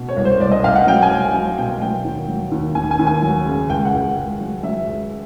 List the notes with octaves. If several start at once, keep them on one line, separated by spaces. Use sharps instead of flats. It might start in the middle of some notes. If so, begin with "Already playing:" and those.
Already playing: B2
C#5
C2
C5
C2 D5
D#5
C2 F5
F#5
F#3 G5
G#5
C2
G5
F#3 G#5
B2 G5
F#3 G5
D#2
F#3
D#2
D#2 G#5
G#5
D#2
G#5
F#3
C#3
C#2 G5
F#5
C#2
C#2
F#3
F#3 E5
C#2